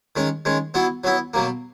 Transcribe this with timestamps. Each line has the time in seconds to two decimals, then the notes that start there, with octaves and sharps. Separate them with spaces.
0.16 D#3 G#3 C#4
0.45 D#3 G#3 C#4
0.74 F#3 B3 E4
1.04 F#3 B3 E4
1.34 B2 F#3 A#3